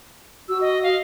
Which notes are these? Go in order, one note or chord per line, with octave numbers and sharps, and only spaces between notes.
F#4 E6
D#5
F5